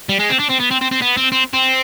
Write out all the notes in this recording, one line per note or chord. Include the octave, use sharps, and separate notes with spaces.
G3
G#3
C4
D4
C4
B3
C4
C4
C4
B3
C4
C4
C4